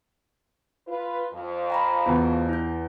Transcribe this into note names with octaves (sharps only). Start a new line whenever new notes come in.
F4 B4
F2
G5 A#5 B5
E2 F4
E4 G6